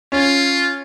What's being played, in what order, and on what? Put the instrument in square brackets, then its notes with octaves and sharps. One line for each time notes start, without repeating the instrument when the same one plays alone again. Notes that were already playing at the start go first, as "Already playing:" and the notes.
[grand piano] C#4 [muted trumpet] F4